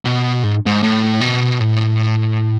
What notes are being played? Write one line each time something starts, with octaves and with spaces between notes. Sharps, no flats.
B2
G#2
G#2
A2
B2
A2